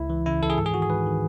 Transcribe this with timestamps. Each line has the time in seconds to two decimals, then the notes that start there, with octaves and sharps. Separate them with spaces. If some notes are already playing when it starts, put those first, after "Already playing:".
Already playing: C#2 E4
0.10 E3
0.26 C#3 E4
0.43 E3 A4
0.50 G#4
0.58 G#2 A4
0.66 G#4
0.74 D#3 F#4
0.82 G#4
0.90 G#2 B4
1.06 D#3